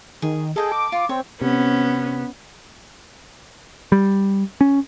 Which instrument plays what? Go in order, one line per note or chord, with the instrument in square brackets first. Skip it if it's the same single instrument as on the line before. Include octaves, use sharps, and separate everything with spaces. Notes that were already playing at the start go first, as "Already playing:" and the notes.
[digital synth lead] D#3 [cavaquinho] G#4
[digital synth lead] G#4 [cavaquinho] A4 D#5 G5
[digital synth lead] D6
[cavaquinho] F4
[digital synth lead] C4 [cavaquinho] C#5
[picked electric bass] C3 [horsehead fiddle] B3 [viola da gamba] C#4
[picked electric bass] G3
C#4